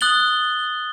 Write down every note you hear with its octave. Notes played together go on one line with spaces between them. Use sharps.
D#6 F#6 A6 F#7 G7